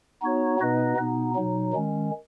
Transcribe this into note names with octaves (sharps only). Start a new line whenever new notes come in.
B3 D#4 F#4 C#5
B2 B3 D#4 B4 D#5
B2 B3 D#4
B2 F#3 D#4
D#3 G#3 C#4